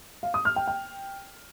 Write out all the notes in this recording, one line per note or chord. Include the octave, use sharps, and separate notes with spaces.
F5
D#6
F6
G5
G5